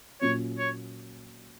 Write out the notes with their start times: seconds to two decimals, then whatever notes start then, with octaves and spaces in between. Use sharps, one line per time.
0.21 A#2 F#3 A#3 C#4 F4 C#5
0.58 C#5